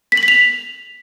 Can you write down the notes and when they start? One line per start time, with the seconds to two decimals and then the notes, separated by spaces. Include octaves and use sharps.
0.12 B6
0.17 F#7
0.23 B6
0.28 F7